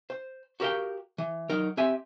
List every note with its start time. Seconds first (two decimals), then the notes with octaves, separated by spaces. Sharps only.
0.10 C5
0.60 F#4 G4 A#4 F5 G5
1.18 E3
1.50 F#3 D#4 A#4
1.77 C4 G4 E5 G#5